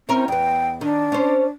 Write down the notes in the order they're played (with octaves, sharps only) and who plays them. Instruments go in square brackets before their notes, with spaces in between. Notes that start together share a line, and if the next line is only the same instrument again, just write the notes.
[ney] C4 [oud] C#4 E4 A#4
[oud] E2 B3 [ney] G5
[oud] D#3 [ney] D4
[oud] C#4 C5